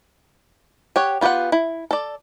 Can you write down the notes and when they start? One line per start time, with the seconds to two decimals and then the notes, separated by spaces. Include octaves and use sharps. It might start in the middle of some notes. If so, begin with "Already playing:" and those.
0.96 G4 C#5 F#5
1.21 B3 F4 G4 B4 F#5
1.52 E4
1.91 A4 D5